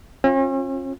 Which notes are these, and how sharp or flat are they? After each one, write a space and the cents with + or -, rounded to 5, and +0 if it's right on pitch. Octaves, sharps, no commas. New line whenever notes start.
C#4 -45 F4 +20